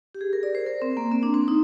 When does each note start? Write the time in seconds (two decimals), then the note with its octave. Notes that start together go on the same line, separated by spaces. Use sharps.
0.15 G4
0.21 G#4
0.33 A#4
0.43 D5
0.55 C5
0.66 A#4
0.82 C4
0.97 A#3
1.12 C4
1.23 D4
1.34 C4
1.48 D#4